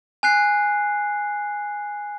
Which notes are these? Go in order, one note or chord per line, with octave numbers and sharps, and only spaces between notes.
G#5 F#6 C7